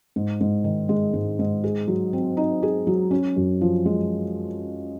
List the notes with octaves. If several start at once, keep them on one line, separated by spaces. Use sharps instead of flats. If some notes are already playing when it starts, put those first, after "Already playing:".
G#2
G#2
D#3
G#3
G#2
G#2
G#4
F#3
C4
D#4
G#4
F#3
C#4
F#2
F3
G#3